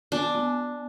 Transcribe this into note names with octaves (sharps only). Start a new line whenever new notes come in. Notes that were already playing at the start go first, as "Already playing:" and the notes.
B3 D4
B3